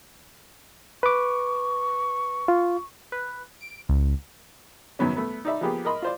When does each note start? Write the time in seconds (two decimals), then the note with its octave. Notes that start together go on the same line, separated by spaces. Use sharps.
1.03 B4 C#6 D6
2.48 F4
3.12 B4
3.61 D7
3.89 C#2
4.99 F#2 D#3 F#3 B3 C#4
5.16 A3 B3
5.45 D#4 D5 E5 B5
5.61 F3 A#3 B3 G4 G#4
5.85 A#4 D#5 B5 C6
6.02 F4 C5 D5